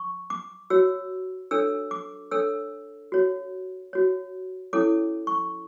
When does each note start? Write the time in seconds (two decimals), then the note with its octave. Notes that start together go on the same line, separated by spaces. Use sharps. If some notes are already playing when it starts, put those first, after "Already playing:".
Already playing: C#6
0.30 D6
0.70 F#4 C#5 E6
1.51 D4 A4 C#5 E6
1.91 D6
2.31 D4 A4 C#5 E6
3.12 F#4 C#5
3.93 F#4 C#5
4.73 C#4 E4 A4 C#5 D6
5.27 C#6